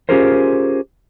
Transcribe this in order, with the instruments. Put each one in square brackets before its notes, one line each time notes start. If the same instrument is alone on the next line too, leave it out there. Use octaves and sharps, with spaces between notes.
[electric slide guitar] C#4 F4 G4 G#4 A#4 C5